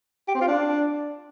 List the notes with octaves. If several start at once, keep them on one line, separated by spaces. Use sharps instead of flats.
G4
C4
F4
D4